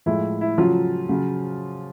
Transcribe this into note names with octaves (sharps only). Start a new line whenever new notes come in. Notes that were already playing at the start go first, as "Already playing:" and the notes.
A2 F3 G#3 E4
E4
C#3 F3 F#3 F4
C#3 F#3